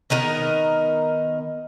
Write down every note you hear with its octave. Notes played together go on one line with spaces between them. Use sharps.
D#3 B3 D#4 A#4